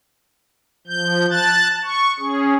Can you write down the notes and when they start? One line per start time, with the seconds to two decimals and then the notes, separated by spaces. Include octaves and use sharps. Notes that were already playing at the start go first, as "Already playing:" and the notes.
0.87 F3 G6
1.30 A5 F#6 A6
1.84 C#6
2.19 C#4 G#4